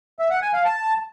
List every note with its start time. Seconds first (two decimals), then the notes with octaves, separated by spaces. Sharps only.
0.19 E5
0.31 F#5
0.42 G#5
0.53 F5
0.65 A5